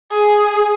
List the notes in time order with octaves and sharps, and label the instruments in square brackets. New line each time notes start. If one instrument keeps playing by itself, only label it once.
[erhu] G#4